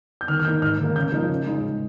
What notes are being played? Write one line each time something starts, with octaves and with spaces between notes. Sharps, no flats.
G6
D#3 F6
F6
A#3 D#4 G6
G#2 F6
D#3 A#3
C#3 G6
F3 A#3 D#4
C#3
G#3 D#4